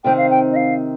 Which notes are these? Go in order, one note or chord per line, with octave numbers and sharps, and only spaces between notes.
C3 D#3 C4 D#4 G5
F5
G5
D#5
F5